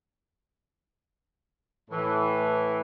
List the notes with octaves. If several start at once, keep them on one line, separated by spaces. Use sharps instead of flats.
A2 E3